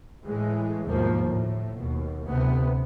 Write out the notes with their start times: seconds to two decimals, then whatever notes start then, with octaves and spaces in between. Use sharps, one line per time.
0.24 A2 E3 G#3
0.87 G1 D#2 G#2 B2 F3 A#3
1.24 A2
1.77 D#2 B2
2.25 D2 C3 B3